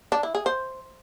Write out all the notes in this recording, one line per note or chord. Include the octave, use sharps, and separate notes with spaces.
D4
E4
G#4
C5